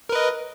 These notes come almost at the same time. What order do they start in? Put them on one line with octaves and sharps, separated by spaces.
A#4 B4 D#5